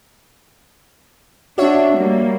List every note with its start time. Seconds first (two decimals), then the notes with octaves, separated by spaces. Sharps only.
1.58 D4 F#4 C#5 E5
1.96 G3 A#3